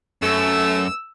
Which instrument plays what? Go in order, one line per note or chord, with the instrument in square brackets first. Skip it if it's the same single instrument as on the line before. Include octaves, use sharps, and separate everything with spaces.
[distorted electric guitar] F#2 [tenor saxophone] A3 [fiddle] E6